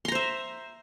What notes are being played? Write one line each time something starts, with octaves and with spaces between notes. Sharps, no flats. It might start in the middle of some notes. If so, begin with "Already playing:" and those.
C5 E5 A#5 C6